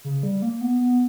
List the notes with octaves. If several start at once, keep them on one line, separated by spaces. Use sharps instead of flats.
C#3
G3
A#3
B3
B3